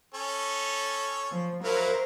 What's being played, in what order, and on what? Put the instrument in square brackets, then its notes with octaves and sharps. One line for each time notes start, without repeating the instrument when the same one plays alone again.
[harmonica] C#4 A4 C#5
[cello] F3
[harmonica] F#3 E4 F5 [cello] A#4 C5